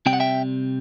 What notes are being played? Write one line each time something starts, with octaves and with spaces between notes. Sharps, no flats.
C3 G3 C4 G5
F#5
E5 G5